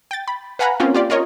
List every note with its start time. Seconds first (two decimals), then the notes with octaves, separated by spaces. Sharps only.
0.11 G5 A6
0.28 B5
0.59 B4 F5 F#5 G#5 A#5 B5
0.80 A#3 C4 C#4 F4
0.95 F4 G4 D5
1.10 F4 A#4 C#5 D#5